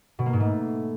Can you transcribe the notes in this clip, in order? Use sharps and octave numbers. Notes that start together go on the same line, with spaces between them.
B2
A#3
G#2
A3